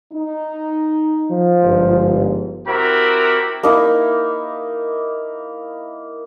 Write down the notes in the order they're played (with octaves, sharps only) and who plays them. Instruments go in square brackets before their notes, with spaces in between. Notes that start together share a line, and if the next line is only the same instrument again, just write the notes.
[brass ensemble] D#4
[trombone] F3
[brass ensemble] G1 G#2
[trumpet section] C4 E4 F#4 G4 A#4 B5
[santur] A#3 D#4 E4